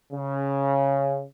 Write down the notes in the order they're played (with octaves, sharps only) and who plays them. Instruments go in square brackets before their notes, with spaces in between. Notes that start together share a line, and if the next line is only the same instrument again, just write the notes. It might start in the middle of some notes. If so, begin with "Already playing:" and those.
[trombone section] C#3